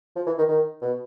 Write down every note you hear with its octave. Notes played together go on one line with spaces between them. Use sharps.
F3
E3
D#3
D#3
B2